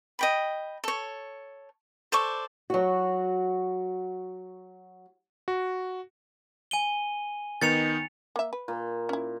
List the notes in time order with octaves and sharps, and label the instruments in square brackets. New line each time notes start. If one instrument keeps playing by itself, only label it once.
[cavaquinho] D#5 G5 B5
A4 C#5
A4 C5 D5 C#6
[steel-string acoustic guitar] F#3 F#4
[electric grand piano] F#4
[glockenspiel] G#5 D#7 G7
[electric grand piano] D#3 B3 D#4 [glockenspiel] A6 C#7 F7
[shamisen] A#3 E5
B4
[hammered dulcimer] A#2
[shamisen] C#4 E4